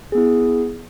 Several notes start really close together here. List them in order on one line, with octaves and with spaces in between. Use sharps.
G#4 B3 E4